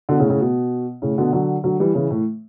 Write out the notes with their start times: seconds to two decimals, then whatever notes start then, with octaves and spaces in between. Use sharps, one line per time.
0.09 B2 D3
0.19 A2 C#3
0.30 A2 C#3
0.40 B2
1.02 A2 C#3
1.18 B2 D3
1.33 D3 F#3
1.64 D3 F#3
1.80 E3 G3
1.95 C#3 E3
2.10 A2